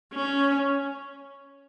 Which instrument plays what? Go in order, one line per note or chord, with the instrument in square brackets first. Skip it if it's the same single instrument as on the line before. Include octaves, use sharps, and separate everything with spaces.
[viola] C#4